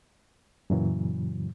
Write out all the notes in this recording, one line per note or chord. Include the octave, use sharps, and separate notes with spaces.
F#2 A#2 C#3 E3 F#3